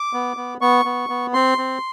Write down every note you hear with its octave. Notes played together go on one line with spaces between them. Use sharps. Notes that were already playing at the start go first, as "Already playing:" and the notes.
Already playing: D6
B3
B3
B3 C#6
B3
B3
C4 C6
C4